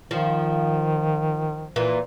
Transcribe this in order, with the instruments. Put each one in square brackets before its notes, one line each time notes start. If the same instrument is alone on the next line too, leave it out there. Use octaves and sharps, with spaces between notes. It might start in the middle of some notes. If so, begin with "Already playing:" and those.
[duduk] D#3 [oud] F3
[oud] A#2 E3